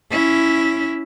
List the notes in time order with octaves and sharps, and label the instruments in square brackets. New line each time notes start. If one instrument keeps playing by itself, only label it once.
[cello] C#4 E4